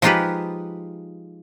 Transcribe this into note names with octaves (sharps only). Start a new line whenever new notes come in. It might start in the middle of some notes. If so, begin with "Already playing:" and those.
F3 G#3 D#4 F4 G4 B4